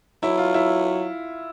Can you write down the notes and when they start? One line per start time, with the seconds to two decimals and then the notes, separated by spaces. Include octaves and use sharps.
0.23 F#3 E4
0.38 F4
0.54 E4